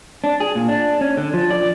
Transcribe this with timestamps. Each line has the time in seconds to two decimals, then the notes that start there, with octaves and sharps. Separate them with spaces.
0.24 D4
0.40 G#4
0.55 A#2
0.68 D4
1.01 C#4
1.17 D3
1.34 F3
1.51 D5